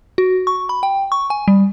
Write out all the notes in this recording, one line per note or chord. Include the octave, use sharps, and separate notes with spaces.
F#4
C#6
B5
G5
C#6
G#5
G3